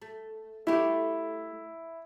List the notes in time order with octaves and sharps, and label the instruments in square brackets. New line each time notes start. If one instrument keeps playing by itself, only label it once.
[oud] A3
[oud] A3 G4 [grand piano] E4